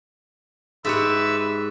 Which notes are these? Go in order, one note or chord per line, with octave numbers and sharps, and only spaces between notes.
G#2 G4 B4 C#5 E5 E6